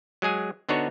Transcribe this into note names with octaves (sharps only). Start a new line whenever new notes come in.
F#3 G#3 G#4 G#5
D3 B3 D4 D#4 F#4 C#5